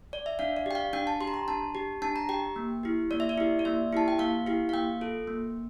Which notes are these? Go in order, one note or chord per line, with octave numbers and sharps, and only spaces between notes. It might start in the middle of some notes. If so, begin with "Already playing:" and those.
D5
E5
D4 F5
D5
G4 G5
F5
D4 G5
A5
G4 C6
A#5
C6
D4 A5
G4
D4 A5
A#5
G4 G5
A#3
E4 G4
A#3 D5
E5
D5
E4 G4
D5
A#3 E5
E4 G4 A5
G5
A#3 F5
E4 G4
F5
A#3 G5
F4 A4
A#3